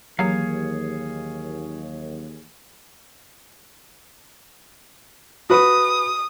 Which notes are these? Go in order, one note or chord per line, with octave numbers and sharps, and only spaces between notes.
D#2 E3 F#3 A#3 G4 G#4 C#5 F5
F#4 B4 D#6